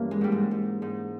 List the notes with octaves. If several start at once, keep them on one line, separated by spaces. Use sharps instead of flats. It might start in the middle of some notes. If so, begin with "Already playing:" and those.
Already playing: G2 E3 A#3 C#4 F4
G#3
G#2 G3
G#3
G#2
G#2